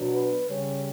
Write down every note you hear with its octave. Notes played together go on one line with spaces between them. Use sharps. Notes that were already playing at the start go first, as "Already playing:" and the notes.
Already playing: B2 F#3 B3 D4
B4
C#3 G3 C#4 C#5